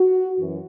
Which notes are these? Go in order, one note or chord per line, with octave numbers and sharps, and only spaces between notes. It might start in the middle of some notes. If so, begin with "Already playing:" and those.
Already playing: F#4
F#2 E3